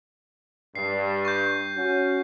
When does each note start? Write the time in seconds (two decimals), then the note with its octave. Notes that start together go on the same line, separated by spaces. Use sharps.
0.75 G2 C7
1.25 C#6 G6
1.76 C#4 F#4